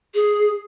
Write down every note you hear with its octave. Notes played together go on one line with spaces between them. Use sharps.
G#4